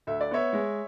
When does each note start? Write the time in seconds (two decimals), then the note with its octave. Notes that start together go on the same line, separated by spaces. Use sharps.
0.07 D2 E5
0.21 D5
0.31 B3 C#5 E5
0.53 G#3